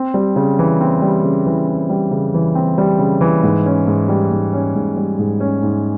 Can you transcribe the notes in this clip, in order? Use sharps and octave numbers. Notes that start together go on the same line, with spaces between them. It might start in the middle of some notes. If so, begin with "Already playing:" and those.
Already playing: C4
G3
C#3
E3
C4
G3
C#3
E3
C4
G3
C#3
E3
C4
G3
C#3
E3
G#2
C#4
G#2
G3
G#2
C#4
G#2
G3
G#2
C#4
G#2